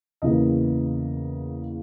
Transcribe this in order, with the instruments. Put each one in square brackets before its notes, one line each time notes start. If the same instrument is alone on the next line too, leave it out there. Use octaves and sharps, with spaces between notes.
[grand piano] E2 C#3 E3 A#3 D#5